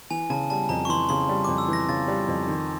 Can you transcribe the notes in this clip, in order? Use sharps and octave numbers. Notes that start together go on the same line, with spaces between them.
E3 G#5
C#3 A5
G3 A5
F2 A#5
C#6
E3 C6
C#3 C6
G3
D6
F2
E6
E3
A#6
C#3 A6
G3
F2
D#3